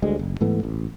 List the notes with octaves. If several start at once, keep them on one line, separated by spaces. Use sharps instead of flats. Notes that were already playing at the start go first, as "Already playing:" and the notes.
D2 G3 G#3
F#1
G#2 E3 A3 B3
A1